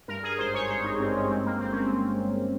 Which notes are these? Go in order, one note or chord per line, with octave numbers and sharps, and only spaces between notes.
G2 A#4
G#4
G#1 C5
C#5
G2 C5
D#4
G2 C4
C#4
G#3 C4
A#3
G1 C4
C#4
C4